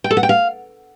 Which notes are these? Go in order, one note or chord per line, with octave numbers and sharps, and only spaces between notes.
G5
A4
F#5
G5
F5